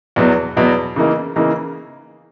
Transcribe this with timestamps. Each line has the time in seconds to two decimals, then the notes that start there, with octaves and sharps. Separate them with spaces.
0.16 E2 B2 F#3 B3
0.57 E2 B2 F#3 B3
0.96 C#3 E3 A#3 D#4
1.36 C#3 E3 A#3 D#4